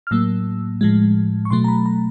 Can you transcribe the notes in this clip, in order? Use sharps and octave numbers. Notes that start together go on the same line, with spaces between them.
F6
A2 F#3 A#3 E6
A2 F3 G#3
C#6
B2 F#3 A3 C6
A#5
B5
A#5